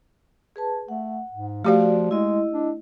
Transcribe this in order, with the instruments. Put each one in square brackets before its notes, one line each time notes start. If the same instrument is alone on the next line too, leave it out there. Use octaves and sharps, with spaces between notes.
[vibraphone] G#4 B4 A5
[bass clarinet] A3 [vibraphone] F#5
[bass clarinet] G#2
[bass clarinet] F3 [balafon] A3 G4 F5 [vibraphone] F#4 D5
[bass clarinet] G#3 [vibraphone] E4 D#5
[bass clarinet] D4